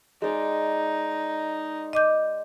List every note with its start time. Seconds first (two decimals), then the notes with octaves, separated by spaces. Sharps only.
0.22 G#3 D#4 D5
1.93 D#5 D6 G6